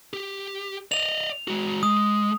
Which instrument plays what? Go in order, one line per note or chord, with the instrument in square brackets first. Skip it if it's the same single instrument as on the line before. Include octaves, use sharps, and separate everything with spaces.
[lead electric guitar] G4
[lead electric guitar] D5 D#5 [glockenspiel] F7
[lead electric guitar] G#3 F#4
[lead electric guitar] G#3 [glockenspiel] D#6